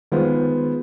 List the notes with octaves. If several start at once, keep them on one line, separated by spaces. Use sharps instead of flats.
D#3 G#3 B3 F4 C5